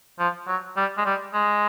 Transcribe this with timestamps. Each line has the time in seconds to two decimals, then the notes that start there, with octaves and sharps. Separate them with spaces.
0.19 F3
0.48 F#3
0.77 G3
0.98 G#3
1.06 G3
1.34 G#3